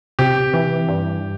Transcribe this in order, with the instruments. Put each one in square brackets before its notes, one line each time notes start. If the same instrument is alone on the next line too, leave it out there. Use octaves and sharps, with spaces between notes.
[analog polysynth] C3 [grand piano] G4
[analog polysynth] E3
G2